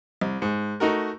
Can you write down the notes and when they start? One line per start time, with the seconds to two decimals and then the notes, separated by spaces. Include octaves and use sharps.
0.21 C2
0.42 G#2
0.80 A3 D#4 F#4 A#4